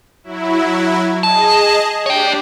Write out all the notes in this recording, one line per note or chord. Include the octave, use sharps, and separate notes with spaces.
F#3 E4
G#4 D#5 A5
D4 G4 C#5 G5